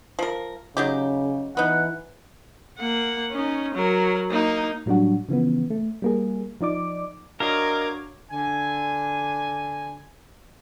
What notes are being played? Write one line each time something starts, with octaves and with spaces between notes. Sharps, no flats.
F3 A#4
C#3 F#3 D#4 G4
E3 B3 D#4 F#5
A#3 F#5
C#4 D#4
F#3 A#4
A#3 D#4
A2 F#3 G3 D4 F#4
C#3 E3 F3 B3
A3
G3 A#3 G#4
F3 D#4 D5 D6
D4 F#4 A#4 C#5 D#5 F5 D6 G#6
D3 G#5